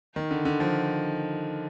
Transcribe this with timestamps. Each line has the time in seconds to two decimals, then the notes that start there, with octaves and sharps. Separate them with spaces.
0.16 D#3
0.31 D3
0.45 D3
0.60 F3